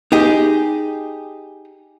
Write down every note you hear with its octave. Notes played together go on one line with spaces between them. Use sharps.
D#4 G4 G#4